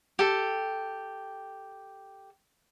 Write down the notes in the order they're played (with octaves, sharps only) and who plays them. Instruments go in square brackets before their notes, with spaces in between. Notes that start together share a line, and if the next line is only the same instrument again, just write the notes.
[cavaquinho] G4 A4